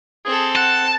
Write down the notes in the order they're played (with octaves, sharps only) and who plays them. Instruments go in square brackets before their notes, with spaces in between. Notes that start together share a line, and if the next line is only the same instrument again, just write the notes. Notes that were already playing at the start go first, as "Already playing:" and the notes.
[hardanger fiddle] C4 A4 [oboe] G#4
[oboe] F#5 [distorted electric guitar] A5